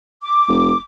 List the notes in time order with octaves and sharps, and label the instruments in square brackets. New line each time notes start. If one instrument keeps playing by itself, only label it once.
[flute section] D6
[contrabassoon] F1